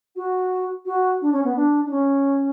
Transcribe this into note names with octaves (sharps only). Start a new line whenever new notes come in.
F#4
F#4
D4
C#4
B3
D4
D4
C#4